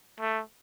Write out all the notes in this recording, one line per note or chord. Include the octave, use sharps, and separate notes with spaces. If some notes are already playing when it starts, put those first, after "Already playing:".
A3